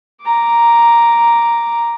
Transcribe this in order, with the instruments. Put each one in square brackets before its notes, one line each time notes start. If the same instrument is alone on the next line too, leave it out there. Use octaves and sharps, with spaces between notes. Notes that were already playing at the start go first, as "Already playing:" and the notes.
[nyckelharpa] A#5 D6